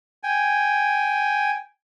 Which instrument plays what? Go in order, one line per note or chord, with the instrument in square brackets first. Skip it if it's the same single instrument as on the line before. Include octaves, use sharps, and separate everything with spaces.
[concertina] G5 G#5